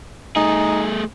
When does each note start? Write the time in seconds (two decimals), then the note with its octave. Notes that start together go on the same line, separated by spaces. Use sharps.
0.36 A3 D#4 G#4